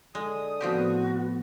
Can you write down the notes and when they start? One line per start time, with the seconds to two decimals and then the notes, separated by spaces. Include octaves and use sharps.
0.15 D3 G#3 D#6
0.61 A2 F3 B3 C4 F#4 G4